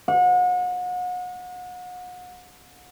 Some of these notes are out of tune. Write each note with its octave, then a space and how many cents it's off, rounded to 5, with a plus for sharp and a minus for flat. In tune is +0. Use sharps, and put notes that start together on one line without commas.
F#5 -35